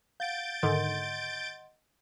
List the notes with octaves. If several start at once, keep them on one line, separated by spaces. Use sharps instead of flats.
F5 F#5 G6 A6 D7
G#2 D3 D#3 D#5 F#5 C6